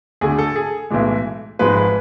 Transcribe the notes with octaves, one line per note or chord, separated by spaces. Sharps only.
D2 D3 A3 G#4
A4
G#4
B1 A2 E3 G#3
G#1 G#2 F3 G#3 B4
B4